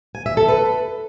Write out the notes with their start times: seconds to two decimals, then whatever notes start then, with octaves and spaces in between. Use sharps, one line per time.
0.15 G#5
0.26 E5
0.37 A4
0.48 B4